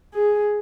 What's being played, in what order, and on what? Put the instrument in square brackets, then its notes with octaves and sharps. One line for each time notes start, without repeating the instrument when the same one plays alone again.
[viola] G#4